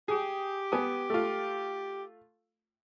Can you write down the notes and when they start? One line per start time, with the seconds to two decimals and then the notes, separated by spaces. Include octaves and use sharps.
0.08 G4 G#4
0.72 B3 G#5 D#6
1.10 A3 F4